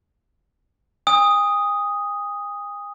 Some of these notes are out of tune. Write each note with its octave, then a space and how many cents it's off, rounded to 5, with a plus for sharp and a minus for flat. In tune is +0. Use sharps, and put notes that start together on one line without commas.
G#5 -40 D#6 +0